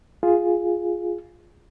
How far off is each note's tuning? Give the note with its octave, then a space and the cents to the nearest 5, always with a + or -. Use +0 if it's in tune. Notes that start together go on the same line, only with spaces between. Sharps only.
F4 +0 G#4 +0